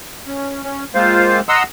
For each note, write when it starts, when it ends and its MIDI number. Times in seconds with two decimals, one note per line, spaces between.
0.27 0.63 61
0.63 0.84 61
0.95 1.40 56
0.95 1.40 58
0.95 1.40 60
0.95 1.40 65
0.95 1.40 72
0.95 1.40 77
1.49 1.63 75
1.49 1.63 78
1.49 1.63 82
1.49 1.63 84
1.49 1.63 87
1.49 1.63 88